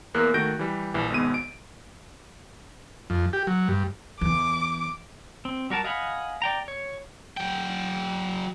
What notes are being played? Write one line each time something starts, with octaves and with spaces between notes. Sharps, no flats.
E2 A#3 A#4 F#6
D#3 A3 F#4 G6 A#6 D7
E3 G3
A#1 E3
G#1 G#2 B2 B3 D#7
D7
F2
G4
F#3
G2
E2 E3 D6
C4
G3 F#4 A#4 A5
D#5 F5 F#5 G#5 B5
D5 G5 A#5
C#5
F#3 G5